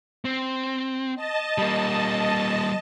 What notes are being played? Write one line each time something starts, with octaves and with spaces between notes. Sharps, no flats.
C4
D#5 A5
G3 A#3